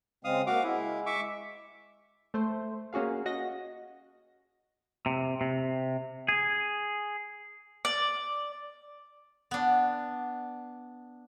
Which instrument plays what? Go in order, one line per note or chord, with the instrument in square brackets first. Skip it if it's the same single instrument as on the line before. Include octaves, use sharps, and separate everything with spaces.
[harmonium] C#3 G#3 C4 [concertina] F5 D#6
[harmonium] A#3 F#5 [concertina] F#4 F5 D6
[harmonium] G#3 [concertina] E4
[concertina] E5 C#6 D6
[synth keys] A3 C5
A#3 C#4 F#4 G#4 F5
F#4 D#5 A#6
[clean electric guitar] C3
C3
G#4
[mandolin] D5
[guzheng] B3 D4